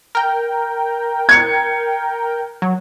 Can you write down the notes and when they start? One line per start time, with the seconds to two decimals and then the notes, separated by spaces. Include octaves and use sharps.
0.15 A#4 G5
1.29 G#6 C#7
2.62 F#3